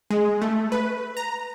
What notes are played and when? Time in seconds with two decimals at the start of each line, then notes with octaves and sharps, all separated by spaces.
0.10 G#3
0.42 A3
0.72 B4
1.17 A#5